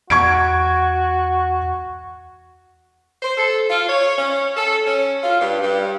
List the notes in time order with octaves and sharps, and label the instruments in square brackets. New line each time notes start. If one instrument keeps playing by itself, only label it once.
[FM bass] E2 [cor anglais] F#4 [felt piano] C#6 G#6 D7
[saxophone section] C5
A4
F4
C#5
C#4
A4
C#4
F4
G2
G2